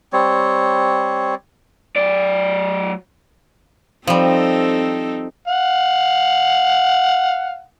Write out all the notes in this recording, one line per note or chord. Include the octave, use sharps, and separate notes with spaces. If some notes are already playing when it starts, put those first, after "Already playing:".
G3 C4 C#5
F#3 D5
F3 G3 C4 D#4 A4
F5 F#5